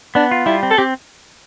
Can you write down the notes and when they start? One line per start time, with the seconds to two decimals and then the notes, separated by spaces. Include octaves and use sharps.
0.15 B3 D4
0.31 F4
0.46 G3 E4
0.63 C4
0.71 A4
0.78 C4 G4